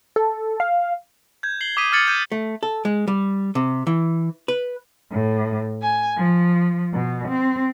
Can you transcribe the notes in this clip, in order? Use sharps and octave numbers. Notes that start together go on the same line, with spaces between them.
A4
F5
G6 G#6
C7 F#7 G7
D6 D#6 B6 D#7
D6 F6 G#6 A6 C#7 F#7
G6 G#6 D#7
A3
A4
G#3
G3
C3
E3
B4
A2
G#5
F3
B2
C4